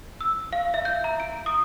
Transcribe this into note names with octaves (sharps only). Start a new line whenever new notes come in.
E6
F5
E5
G6
A#5
D7
D#6